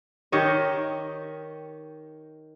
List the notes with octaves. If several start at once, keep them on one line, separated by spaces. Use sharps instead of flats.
D#3 G4 C#5 D#5